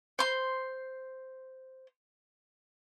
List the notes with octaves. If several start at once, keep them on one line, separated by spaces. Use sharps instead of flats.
C5 C6